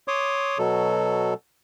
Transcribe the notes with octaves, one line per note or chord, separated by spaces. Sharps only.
C#5 C6 D6 D#6
B2 F#3 A4